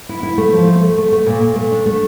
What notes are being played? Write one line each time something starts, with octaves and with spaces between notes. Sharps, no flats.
E4
E4
A3
F3
A3
A3
A3
A3
A#2
A#2
A3
D4
A3